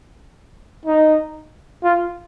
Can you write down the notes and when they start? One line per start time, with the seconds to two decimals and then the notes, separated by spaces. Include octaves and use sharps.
0.86 D#4
1.84 F4